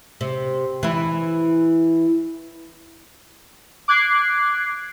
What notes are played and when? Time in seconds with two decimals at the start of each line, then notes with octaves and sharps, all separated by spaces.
0.21 C3
0.83 E3 E4
3.88 D6 F#6 G#6 C7